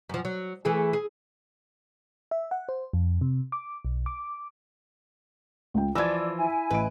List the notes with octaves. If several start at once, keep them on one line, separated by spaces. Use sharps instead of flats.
F#2 F3
F#3
E3 A3 G#4
G#4
E5
F#5
C5
F2
C3
D6
B1
D6
C#2 G5
E3 F3 D5 E6 G#6
E4 G#5
A1 B4 D#5 D7